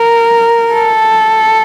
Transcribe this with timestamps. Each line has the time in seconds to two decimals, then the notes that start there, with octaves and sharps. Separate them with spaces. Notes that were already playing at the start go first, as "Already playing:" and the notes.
Already playing: A#4
0.74 A4